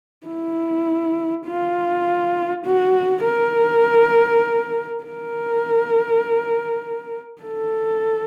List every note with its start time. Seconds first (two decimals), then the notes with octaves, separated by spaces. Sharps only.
0.27 E4
1.46 F4
2.65 F#4
3.25 A#4
5.04 A#4
7.42 A4